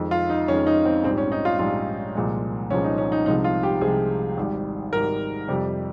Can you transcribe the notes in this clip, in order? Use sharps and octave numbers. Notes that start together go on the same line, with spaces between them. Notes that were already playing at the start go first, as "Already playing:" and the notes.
Already playing: F2 D#3 G#3
F4
D#4
F2 D#3 G#3 C#4
D#4
C4
A#1 G#2 G3 C4
C#4
D#4
F4
A#1 G#2 G3 F4
C2 A#2 F3 G#3
C2 A#2 F3 G#3 C#4
D#4
C#4
D#4
C2 C3 F3 G#3 D#4
F4
G4
C2 C3 F3 G#3 G#4
G#1 G#2 G3
G#1 G#2 G3 A#4
F2 C3 G3